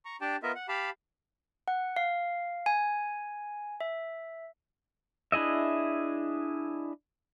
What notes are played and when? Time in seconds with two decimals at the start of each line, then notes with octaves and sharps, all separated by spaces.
0.05 A#5 C#6
0.21 D4 G4 D5 G5 A5
0.43 B3 F4 A#4 D#5 E5
0.55 F#5
0.69 G4 F5 A5 B5
1.68 F#5
1.96 F5
2.66 G#5
3.81 E5
5.32 D4 E4 G#4 D#5 E5